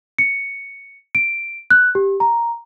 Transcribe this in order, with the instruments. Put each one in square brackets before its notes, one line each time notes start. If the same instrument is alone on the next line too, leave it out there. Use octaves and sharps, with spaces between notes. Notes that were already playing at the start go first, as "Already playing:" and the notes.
[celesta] C#7
D7
F#6
G4
A#5